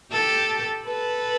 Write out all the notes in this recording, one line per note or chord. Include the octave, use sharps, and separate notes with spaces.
G4 A4
A4 B4